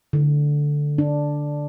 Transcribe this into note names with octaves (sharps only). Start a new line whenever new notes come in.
D3
D4